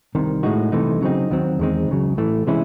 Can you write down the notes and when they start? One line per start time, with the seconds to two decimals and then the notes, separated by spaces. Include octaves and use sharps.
0.15 C2 C3 D#3
0.43 A2 G#3 D#4 F#4
0.72 C2 C3 E3 A3 D#4
1.01 C#3 F#3 C4 D#4
1.30 D#2 D#3 F#3 C4
1.59 E2 D#3 G#3 C4 D#4
1.88 C#2 C#3 F#3
2.17 A2 E3 A3
2.47 C3 E3 G#3 C#4 E4